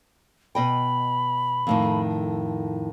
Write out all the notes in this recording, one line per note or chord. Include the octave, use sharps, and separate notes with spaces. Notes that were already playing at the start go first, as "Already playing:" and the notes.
B2 D#5 G5 B5
F2 A2 D#3